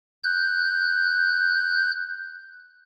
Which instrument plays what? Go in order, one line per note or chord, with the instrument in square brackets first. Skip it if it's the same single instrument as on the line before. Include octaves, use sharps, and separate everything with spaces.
[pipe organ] F#6 G6